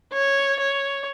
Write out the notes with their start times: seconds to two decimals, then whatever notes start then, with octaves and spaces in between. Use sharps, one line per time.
0.13 C#5
0.60 C#5